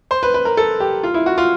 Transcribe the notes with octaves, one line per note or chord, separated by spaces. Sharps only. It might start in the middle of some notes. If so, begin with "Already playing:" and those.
C5
B4
B4
A#4
A4
G4
F4
E4
F#4
F4